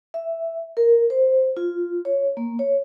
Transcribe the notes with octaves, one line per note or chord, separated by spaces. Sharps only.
E5
A#4
C5
F4
C#5
A#3
C#5